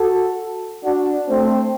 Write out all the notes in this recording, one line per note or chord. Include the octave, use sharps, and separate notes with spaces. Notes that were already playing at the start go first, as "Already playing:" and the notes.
Already playing: F#4 A4
D4 F#4
A3 C4